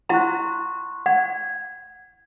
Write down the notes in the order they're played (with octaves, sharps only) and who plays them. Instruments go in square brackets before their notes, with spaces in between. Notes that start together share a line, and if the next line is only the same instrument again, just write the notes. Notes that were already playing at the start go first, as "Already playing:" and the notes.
[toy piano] E4 F#5 A#5 [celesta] C6 C#6 F#6
[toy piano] F#5 [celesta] G#6